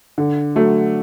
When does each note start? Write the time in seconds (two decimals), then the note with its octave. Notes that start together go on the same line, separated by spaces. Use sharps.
0.18 D3
0.55 F#3 A3